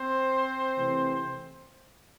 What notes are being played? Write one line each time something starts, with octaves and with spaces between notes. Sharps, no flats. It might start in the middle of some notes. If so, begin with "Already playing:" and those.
Already playing: C4 C5
C3 E3 A3